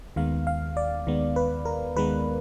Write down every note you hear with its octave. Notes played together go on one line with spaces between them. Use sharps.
D#2 D#3 G#3 B3 F5
F5
D5
D#2 D#3 G#3 B3
B4
A#4
D#2 D#3 G#3 B3 B4